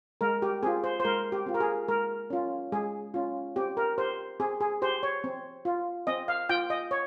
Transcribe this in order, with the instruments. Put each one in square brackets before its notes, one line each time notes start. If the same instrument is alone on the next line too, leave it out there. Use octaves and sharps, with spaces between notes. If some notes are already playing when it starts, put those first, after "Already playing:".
[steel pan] G#3 A#4
G4
C4 F4 G#4
C5
C5
G#3 A#4
G4
C4 F4
A#4
G#4
G#3 A#4
C#4 F4
G#3 G#4
C#4 F4
C4 G4
A#4
G4 C5
C4 G#4
G#4
G4 C5
C#5
C4
F4
C4 D#5
F5
F4 G5
D#5
C#5